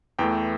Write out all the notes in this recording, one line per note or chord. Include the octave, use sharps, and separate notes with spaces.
E2 E3 A3 G5